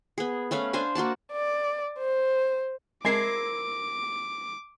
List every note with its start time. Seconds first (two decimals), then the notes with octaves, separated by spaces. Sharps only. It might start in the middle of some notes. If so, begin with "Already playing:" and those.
0.18 B3 G#4
0.51 A3 C#4 B4 F5
0.73 D4 C5 F5 G#5
0.95 A#3 F#4 D5 A5
1.32 D5
1.99 C5
3.05 G#3 C4 E4 A#4 D6 G#6 C7